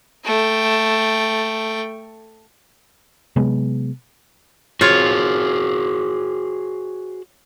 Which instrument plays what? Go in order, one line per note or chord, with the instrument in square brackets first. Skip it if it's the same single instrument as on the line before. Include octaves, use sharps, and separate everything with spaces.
[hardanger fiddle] A3 G5
[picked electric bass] C3 F#3 G#3 B3
[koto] F4 C#5 [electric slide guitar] F#4 G#4 C5